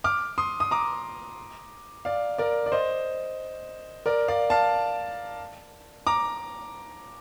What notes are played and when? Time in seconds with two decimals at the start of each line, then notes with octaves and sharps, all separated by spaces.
0.04 D6 F6
0.38 C6 D#6
0.60 D#6
0.71 A#5 D6
2.05 D5 F5
2.38 A#4 D5
2.66 D5
2.72 C5 D#5
4.06 A#4 D5
4.28 D5 F5
4.50 F5 A5
6.07 A#5 D6